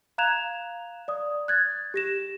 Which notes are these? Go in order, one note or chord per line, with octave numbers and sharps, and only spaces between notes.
F5 A#5 F#6 G#6 E7 F7
D5 D#6
F#6 G#6 A6
G4 A#6 E7